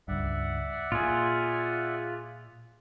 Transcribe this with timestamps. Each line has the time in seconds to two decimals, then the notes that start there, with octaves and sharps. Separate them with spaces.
0.08 C#2 G2 D5 E5 F#5
0.92 A#2 F4 G#4